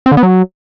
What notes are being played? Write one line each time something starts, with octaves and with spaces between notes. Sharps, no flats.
C4
D3
B3
F#3